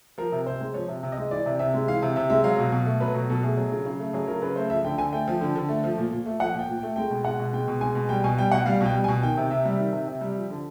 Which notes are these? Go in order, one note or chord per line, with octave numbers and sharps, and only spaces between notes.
F3 A#4
C3
C3 C5
G#3
F3 C#5
C3
C3
D#5
G#3
E3 D5
C3
C3 E5
G#3
E3 F5
C3
C3 E5
G#3 E5
F#3 F5
B2
B2
A3
F#3 B4
B2
B2 A4
A3 G#4
F#3
C#3
C#3
A3
F#3 G#4
C#3 A#4
C#3 B4
A3 C5
F3 E5
D3 G5
D3 G#5
A3 G5
F3
D3
D3
A3
F3
A#2
A#2
A3
F3 F#5
A#2 G5
A#2
G5
A3
G#3 G5
B2
G#3 F#5
B2
G#3 G5
B2
G#3 G#5
B2
G3 G5
B2 G#5
G3 G5
B2 F#5
G3 F5
B2 G5
G3
B2 G#5
D#3 G5
C3
C3 E5
G3
D#3
C3
C3
G3
F3
D3